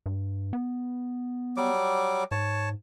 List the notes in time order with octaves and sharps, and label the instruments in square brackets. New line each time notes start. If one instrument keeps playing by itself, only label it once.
[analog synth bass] G2
B3
[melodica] F#3 G3 D6
[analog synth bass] G#2 [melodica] C#5 A5